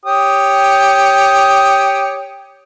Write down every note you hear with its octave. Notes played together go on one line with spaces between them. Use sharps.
G4 C#5 D#6